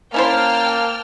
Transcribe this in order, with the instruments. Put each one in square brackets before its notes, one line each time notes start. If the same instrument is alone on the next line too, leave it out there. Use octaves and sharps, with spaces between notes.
[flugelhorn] A#3 [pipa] C#4 E4 C5 [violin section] G5 A5 F6